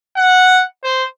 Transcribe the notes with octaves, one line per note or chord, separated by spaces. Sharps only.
F#5
C5